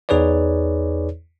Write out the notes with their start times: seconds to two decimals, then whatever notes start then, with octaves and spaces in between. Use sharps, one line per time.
0.09 E2 D#4 G#4 B4 C#5 D5